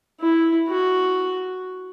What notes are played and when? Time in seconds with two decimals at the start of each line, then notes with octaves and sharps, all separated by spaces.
0.21 E4
0.68 F#4